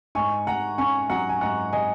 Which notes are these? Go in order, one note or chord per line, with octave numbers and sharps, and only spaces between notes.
G#2 G#5 C#6
G#2 F#5 A#5
C#4 G#5 C#6
F#3 F#5 A#5
G#5
G#2 F#5 A#5
D#5 G#5